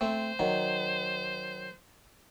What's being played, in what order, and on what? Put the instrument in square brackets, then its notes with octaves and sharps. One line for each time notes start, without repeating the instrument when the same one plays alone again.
[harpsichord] A3 C4 [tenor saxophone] C5
[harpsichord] D#3 F#3